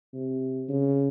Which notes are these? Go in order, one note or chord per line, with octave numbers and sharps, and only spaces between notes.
C3
C#3